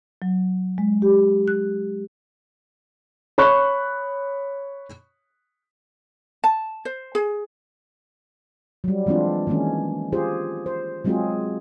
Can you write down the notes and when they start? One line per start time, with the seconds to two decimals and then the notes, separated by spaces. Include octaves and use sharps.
0.22 F#3
0.78 G#3
1.02 G4
1.48 F#6
3.38 C#5 B5 C#6 F#6
6.44 A5
6.85 C5
7.15 G#4
8.84 F#3 G3
9.06 E3 G#3 C4 D4 F4
9.47 D#3 E3 G#3 A#3 C#4
10.12 F4 G4 G#4 C5
10.66 C5
11.05 F#3 G#3 C4 F4 F#4 G#4